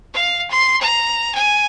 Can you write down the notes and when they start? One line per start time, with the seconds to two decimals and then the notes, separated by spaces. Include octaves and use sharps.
0.14 F5
0.51 C6
0.81 A#5
1.35 G#5